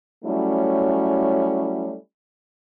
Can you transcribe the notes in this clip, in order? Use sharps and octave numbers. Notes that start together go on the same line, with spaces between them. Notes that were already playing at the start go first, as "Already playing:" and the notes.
F#3 G3 A3 C#4 E4